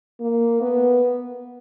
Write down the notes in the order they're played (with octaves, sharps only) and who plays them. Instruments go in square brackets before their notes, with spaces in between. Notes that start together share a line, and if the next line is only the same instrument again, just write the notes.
[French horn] A#3
B3